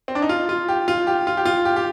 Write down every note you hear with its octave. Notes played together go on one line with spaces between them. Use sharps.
C4
D4
D#4
F4
F4
G4
F4
G4
F4
G4
F4
G4
G4